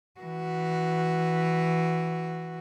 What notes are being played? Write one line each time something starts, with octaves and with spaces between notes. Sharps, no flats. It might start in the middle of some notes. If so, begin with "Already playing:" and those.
E3 F#4